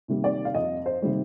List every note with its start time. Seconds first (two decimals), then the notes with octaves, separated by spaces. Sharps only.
0.08 C3 D#3 G3 A#3
0.24 D5
0.45 F5
0.54 F2 D#5
0.86 C5
1.02 C3 D#3 G3 A#3